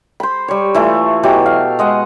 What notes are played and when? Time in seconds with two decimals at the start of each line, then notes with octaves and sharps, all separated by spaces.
0.20 C5 B5
0.48 G3 C#5
0.74 E3 A3 F4
1.23 B2 E3 F#3 G4
1.46 F5
1.79 G#3 D#5 F#5